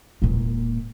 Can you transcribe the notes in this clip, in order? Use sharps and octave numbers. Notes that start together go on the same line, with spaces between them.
E1 A#2